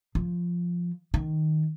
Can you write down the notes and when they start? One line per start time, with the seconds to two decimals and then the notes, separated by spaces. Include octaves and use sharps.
0.15 F3
1.14 D#3